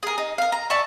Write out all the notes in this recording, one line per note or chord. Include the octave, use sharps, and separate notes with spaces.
G#4 A#4
D#4
A#4 F5
A#5
D5 E5 A5 C#6